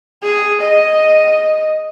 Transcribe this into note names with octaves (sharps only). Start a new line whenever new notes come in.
G#4
D#5